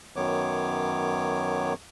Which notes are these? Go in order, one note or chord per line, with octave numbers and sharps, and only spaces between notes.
F#2 D#3 F#3 B3 C#5 D6